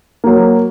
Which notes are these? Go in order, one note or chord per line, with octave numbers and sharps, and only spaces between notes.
F#3 A#3